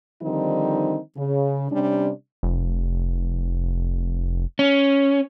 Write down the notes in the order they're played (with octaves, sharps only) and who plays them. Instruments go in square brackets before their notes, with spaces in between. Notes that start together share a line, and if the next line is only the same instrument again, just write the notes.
[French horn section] D3 D#3 F3 G3 C4 D#4
C#3
C3 G3 C#4 D4
[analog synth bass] F1
[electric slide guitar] C#4